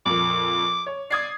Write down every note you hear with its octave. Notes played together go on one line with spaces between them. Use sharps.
F2 A#2 D6
C#5
D5 D#6 G#6 C7